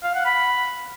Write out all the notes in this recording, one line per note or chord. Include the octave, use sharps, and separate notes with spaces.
F5
F#5
B5